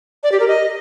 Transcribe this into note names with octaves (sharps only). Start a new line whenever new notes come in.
D5
G4
A#4
D#5